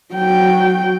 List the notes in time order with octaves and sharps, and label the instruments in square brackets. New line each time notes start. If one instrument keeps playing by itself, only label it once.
[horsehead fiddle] F#3 G5